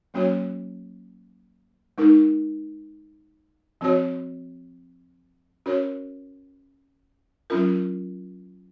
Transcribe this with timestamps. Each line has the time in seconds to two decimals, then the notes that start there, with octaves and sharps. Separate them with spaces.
0.14 F#3 A#3 C#4 F#4 C#5
1.98 G#3 D#4 A#4
3.81 F3 C4 F#4 C#5
5.66 C#4 F#4 A#4 C#5
7.50 F#3 C#4 F4 A#4